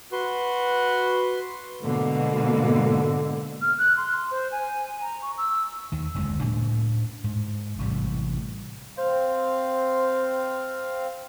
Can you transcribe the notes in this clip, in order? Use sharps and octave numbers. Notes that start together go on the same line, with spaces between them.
F#4 B4 C6
G#2 B2 D3 A#3
F6
F#6
C6
C5
G#5
A#5
C#6
E6
D#2 D#3
F#1 D2 C3 G#3
A2 C#3 D4
G#2
A1 C3 G3
C4 C5 F5